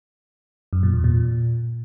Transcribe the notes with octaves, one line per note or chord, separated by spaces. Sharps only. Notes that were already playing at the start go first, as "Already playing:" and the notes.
F#2
A#2
E2
A#2